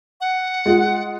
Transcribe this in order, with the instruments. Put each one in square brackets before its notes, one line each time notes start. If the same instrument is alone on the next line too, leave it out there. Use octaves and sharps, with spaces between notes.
[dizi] F#5
[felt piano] G#3 F4